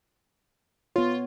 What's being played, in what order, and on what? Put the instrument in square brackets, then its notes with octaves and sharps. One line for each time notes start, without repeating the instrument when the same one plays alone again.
[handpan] B3 C#5 [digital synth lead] F4